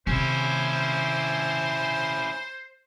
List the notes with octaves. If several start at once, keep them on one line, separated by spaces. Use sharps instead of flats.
C3 D#3 C#4 E4 C5